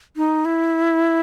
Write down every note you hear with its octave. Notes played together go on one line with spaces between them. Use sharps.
D#4
E4